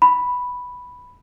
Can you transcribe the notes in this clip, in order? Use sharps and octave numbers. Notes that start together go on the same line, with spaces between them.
B5